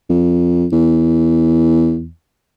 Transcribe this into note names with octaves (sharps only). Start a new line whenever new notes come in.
F2
E2